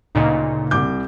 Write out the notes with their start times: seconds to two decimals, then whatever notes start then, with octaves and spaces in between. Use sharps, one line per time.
0.15 D2 A#2 C#3 D#4 D#5
0.71 C2 D6 G6